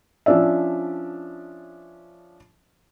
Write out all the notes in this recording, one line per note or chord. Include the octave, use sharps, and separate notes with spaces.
F3 C#4 D4 D5 E5